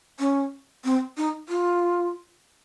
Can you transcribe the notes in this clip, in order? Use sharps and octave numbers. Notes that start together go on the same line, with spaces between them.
C#4
C4
D#4
F4